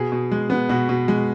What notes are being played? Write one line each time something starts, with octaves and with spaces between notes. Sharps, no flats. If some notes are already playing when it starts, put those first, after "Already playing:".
Already playing: B2 G#4
B2
G#3
B3
B2 F#4
B2
G#3